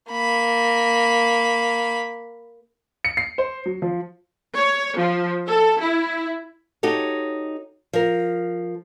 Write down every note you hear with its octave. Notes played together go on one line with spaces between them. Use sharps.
A#3 B5
C#7
C7
C5
F#3
F3
C#5
F3
A4
E4
D#4 F#4 G4 A4 C#5
F3 A#4